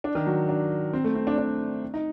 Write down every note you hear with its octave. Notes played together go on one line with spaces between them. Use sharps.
D4
D#3
F#3
D4
C4
A3
C4
D4
D4
D#4